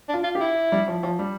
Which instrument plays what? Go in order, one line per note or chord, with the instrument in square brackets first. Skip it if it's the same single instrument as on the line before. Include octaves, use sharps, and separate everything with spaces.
[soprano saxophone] D4
[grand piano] F4
[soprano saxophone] F4
[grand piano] G4
[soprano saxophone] E4
[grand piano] G3
F3
F3
G3